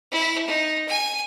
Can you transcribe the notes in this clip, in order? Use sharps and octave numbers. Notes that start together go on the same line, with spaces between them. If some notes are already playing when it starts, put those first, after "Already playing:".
E4
D#4
G#5